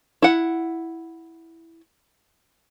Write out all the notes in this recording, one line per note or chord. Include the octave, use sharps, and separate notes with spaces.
E4 F#5